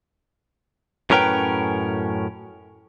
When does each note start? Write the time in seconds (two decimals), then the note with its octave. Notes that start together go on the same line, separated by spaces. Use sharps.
1.10 F#2 A2 C#4 A#4 B4 G5